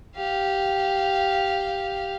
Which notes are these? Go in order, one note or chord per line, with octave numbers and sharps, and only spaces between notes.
G4 F5